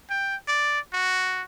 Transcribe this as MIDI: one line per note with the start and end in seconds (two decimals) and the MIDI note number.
0.10 0.36 79
0.48 0.80 74
0.93 1.43 66